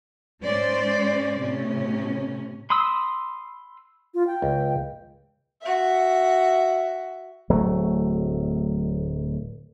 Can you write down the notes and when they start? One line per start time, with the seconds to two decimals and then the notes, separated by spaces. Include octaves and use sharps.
0.44 G#2 G#3 C#4 C5 D5
1.40 A2 C3 C#4
2.70 B5 C6 D#6 E6
4.14 F4
4.27 G5
4.42 C#2
5.62 F#4 E5
7.50 D1 F#3 A3